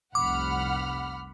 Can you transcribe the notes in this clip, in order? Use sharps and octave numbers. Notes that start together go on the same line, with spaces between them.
F1 C2 F#5 B5 D6 F6